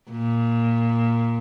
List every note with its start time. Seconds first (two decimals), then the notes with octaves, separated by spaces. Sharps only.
0.11 A#2